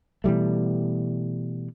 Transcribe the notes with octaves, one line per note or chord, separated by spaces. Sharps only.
B2 E3 G3 A3